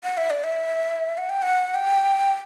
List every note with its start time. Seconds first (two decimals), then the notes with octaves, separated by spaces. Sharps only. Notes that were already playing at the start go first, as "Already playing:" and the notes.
0.04 F#5
0.17 E5
0.30 D5
0.44 E5
1.18 F#5
1.29 G5
1.42 F#5
1.75 G5